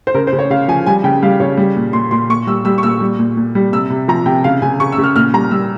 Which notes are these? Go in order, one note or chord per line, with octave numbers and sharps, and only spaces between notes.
C5
C#3 A#4
C5
C#3
C#5
C#3 F5
F3 G#5
G3 G#5
C#3 G5
G3 F5
C#3 C#5
G3
A#2
A#2 C6
A#2 C6
A#2 C#6
G3 E6
G3 E6
C#6
A#2 E6
G3
A#2
A#2
G3
C3 E6
C3
F3 A#5
C3 G5
C#3 F5
C#3 G#5
C#3 C#6
E6
C#3
F6
A#2 F6
G3 A#5
G3 E6